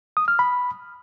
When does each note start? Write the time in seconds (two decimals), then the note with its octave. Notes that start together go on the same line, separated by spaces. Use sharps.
0.17 D#6
0.28 F6
0.39 B5